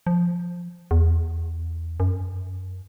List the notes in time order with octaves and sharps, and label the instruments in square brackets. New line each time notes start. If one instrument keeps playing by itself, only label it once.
[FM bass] F3
E2
F#2